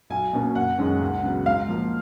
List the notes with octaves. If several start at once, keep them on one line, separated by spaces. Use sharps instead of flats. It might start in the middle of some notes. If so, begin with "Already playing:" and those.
B1 G#5
B2 A#3 C#4
F#1 F#5
F#2 D#3 G#3 C#4
C#2
C#3 F#3 B3
G#2 F5
F3 A#3